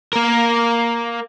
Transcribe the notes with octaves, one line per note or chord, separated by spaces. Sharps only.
A#3 A#4